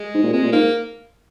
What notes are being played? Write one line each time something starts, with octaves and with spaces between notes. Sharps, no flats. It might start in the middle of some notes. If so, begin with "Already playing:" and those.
Already playing: G#3
G#2
A#2
C3 G#3
A#2
G#2 A#3